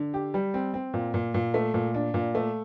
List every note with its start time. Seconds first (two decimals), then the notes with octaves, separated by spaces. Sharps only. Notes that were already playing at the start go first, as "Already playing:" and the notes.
Already playing: D3
0.14 G4
0.34 G3
0.54 C4
0.74 C4
0.94 A#2
1.14 A#2
1.34 A#2
1.54 A3
1.74 A#2
1.94 D4
2.14 A#2
2.35 A3